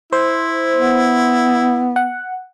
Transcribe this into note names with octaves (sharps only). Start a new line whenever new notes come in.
E4 C5
B3
F#5